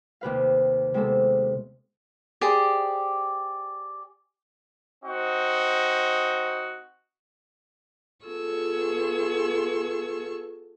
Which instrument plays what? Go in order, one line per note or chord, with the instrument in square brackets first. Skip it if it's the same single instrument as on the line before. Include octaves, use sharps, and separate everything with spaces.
[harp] D#2 C3 B4 F5
C3 G#3 B3 A4
[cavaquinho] G4 G#4 C5 D5
[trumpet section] C4 D#4 F#4 D#5
[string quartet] B3 F4 G#4 A4 C#6 E6